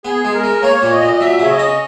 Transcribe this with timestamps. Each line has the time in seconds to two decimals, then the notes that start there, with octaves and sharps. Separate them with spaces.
0.05 B3 G#4
0.25 G#3
0.34 A#4
0.44 G#3
0.62 A#3 C#5
0.82 A#2
0.91 D#5
1.02 A#2
1.13 D#5
1.20 F#3 E5
1.40 C#3 C#5
1.50 D#5
1.59 C#4